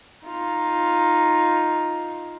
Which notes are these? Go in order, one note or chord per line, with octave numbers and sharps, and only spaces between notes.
D#4 F4